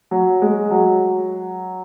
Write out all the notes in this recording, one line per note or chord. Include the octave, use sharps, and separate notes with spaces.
F#3
G#3
F#3